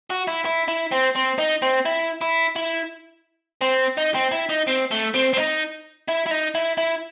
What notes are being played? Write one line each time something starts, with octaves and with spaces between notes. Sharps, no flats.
F#4
E4
E4
E4
C4
C4
D#4
C4
E4
E4
E4
C4
D#4
C4
E4
D#4
C4
A3
C4
C4
D#4
E4
E4
D#4
E4
E4